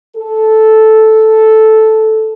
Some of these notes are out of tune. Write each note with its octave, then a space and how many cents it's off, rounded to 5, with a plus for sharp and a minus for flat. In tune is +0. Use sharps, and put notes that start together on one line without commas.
A4 -5